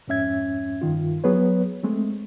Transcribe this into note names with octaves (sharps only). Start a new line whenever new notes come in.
F2 G#2 C#4 E5 G#6
G2 D#3 F4
F#3 B3 G#4 B4 C#5
G#3 A3 C4